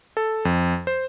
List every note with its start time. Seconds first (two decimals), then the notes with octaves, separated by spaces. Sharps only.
0.17 A4
0.45 F2
0.87 C5